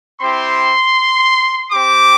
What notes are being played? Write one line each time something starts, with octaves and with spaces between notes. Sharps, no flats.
C4 E4 G4 C6
C4 G4 D6